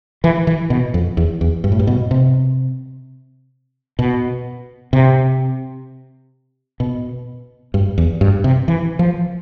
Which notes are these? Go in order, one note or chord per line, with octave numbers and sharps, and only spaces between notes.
E3
E3
B2
F2
E2
E2
G2
A2
G2
B2
C3
B2
C3
B2
G2
E2
G2
C3
E3
F3